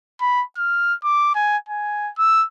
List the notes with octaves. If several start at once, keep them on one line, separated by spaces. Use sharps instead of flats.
B5
F6
D6
G#5
G#5
E6